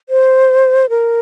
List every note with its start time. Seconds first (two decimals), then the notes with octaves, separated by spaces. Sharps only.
0.09 C5
0.89 A#4